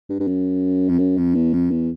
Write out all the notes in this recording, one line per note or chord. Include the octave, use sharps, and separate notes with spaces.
G2
G2
F#2
F2
F#2
F2
E2
F2
E2